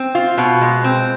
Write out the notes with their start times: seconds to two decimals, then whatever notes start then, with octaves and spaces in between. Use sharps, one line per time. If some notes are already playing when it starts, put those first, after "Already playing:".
Already playing: C4
0.15 F4
0.38 B2
0.61 G#3
0.84 C4